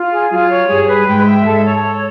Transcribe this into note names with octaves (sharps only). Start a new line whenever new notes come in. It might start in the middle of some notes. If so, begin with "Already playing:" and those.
Already playing: F4
G#4
F#3 F4
C#5
G2 G3 G#4
B4
G#2 G#3 G5
E5
G#2 G#3 A4
C#5
A4